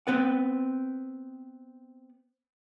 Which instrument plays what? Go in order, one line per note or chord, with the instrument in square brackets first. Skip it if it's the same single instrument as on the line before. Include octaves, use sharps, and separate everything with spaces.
[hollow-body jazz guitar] B3 C4 B4 F#5